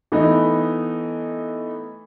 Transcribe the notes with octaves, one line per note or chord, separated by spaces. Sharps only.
E3 A3 B3 D#4